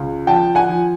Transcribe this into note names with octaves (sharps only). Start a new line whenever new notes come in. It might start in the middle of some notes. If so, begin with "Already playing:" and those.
Already playing: C#2
F3 G5 A5
F#5 G#5
F3